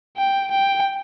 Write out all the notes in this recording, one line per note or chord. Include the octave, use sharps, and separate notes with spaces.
G5
G5